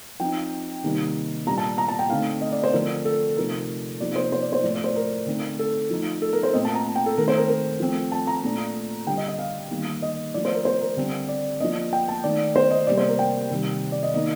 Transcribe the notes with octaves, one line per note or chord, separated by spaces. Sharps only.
F3 C4 D#4 G5
C3 D#3 G3 A#3 D#4
A#2 G3 D4 A#5
A5
A#5
A5
G5
D3 A3 C4 D#4 F5
D#5
D5
C5
D3 F3 A3 C4 A#4
A4
C3 F3 A3 D#4 A#4
C3 F3 A#3 D#4 D5
C5
C5
D5
C5
A2 F3 A3 D5
D5
C5
A#4
D3 A3 C4 D#4
A4
F3 A3 D#4
A4
A#4
C5
A#2 A3 C4 D#5
A5
A#5
A5
G5
A4
D#3 A3 C4 A#4
C5
A#4
A#4
F3 A3 C4
A5
A#5
A#2 A3 D4
D3 G3 D4 G5
D#5
D#5
F5
D#3 G3 A#3 D#4
D#5
F3 A3 D4 D5
C5
A#4
C5
A#4
D3 G3 C4
D5
F3 A#3 D4 D#5
G5
A5
D#3 A3 D#4 D5
C5
D#5
C3 G3 A#3 D5
C5
A#4
G5
C3 D#3 G3
D5
D#5
D#3 A#3 D#4 D#5